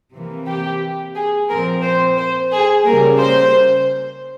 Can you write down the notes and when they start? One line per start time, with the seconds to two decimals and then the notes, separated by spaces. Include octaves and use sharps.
0.14 C3 E3 A#3
0.47 G4
1.15 G#4
1.49 A#2 F3 C4 A#4
1.83 C5
2.17 C5
2.52 G#4
2.85 C#3 G3 A#3 A#4
3.19 C5